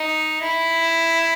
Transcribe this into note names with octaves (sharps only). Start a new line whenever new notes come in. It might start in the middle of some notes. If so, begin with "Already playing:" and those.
Already playing: D#4
E4